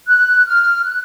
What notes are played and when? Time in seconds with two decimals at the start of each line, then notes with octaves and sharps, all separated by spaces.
0.08 F#6
0.46 F6
0.83 F#6